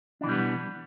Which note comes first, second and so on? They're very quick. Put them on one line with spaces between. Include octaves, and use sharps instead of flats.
D4 E3 B2 G3 B3